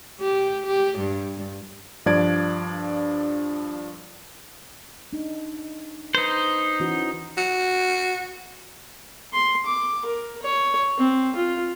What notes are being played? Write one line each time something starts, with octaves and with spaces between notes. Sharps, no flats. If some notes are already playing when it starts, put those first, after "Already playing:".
G4
G4
G2
G2 F3 D4 D5 G#6 D7
D4 D#4
D#4 B4 C5
E3 C#4 F#4
F#4
C6
D6
A#4
C#5
C4
F4